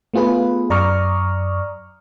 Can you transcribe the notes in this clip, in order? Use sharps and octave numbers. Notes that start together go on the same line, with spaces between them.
A3 B3 F4 G#4 B4
F#2 D5 A#5 C#6 D#6 F6